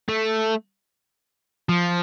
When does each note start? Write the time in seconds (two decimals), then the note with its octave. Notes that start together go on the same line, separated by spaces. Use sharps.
0.09 A3
1.69 F3